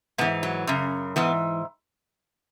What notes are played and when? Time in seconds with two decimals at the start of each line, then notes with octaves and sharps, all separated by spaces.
0.18 G#2 E3 B3
0.43 F#3
0.67 F#2 C#3
1.16 G#2 E3 B3